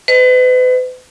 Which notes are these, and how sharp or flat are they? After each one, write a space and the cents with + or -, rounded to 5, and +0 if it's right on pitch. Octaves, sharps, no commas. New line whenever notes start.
B4 +40 D#5 +0